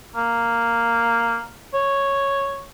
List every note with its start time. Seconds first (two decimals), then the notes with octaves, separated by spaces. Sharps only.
0.16 A#3
1.74 C#5